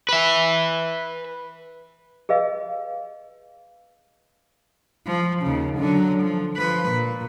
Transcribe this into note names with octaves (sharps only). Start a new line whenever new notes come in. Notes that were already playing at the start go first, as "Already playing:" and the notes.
B4 E5
G#4 B4 D#5 F5
F3
D#2 C#3
D3 F#3
F3
F3 B4
A#2